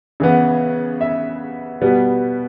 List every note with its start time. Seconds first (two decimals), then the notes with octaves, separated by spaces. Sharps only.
0.20 C#3 E3 B3
1.01 E5
1.81 B2 G3 B3